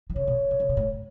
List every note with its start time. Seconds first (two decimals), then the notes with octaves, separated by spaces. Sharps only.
0.10 E3
0.16 C#3 C#5
0.27 B2
0.51 B2
0.60 C#3
0.69 B2
0.77 A2